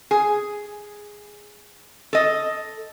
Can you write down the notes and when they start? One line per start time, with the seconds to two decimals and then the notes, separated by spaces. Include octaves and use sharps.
0.11 G#4
2.13 A4 D#5